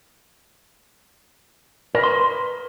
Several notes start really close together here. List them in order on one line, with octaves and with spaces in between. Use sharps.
A#4 B4 C6